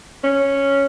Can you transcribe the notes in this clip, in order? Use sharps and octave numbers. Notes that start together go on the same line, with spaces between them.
C#4